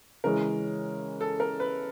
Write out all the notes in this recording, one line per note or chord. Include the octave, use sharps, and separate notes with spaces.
C#3 E3 G#3 C#4 A#4
A4
A#4
B4